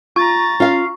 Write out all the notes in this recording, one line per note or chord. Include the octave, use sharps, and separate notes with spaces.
F4 A#5 C#6 A6
C#4 F4 F5